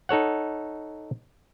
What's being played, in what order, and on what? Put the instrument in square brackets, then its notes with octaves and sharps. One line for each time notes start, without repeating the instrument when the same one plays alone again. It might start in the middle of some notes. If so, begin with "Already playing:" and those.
[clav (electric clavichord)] D#4 A4 C#5 F#5